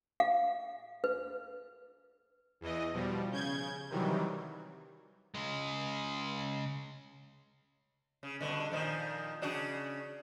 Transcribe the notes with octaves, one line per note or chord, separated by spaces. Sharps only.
F5
B4
E2 E3 D#5
B2 F3 G3
C#3 G6 G#6
C3 D#3 E3 F#3 G3
C#3 G#3
C#3
G2 B2 D3
A#2 D#3 F3
C#3 D4 F#4